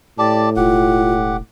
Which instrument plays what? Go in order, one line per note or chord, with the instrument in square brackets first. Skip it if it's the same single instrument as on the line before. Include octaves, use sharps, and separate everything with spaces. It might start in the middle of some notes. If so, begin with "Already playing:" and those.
[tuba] A2 [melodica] G4 D5 A5
[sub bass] E1 [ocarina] F4 [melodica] G4 F#5